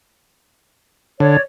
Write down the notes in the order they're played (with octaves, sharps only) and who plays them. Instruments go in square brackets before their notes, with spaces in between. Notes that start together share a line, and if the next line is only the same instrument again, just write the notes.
[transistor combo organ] D3 [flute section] C#5 D5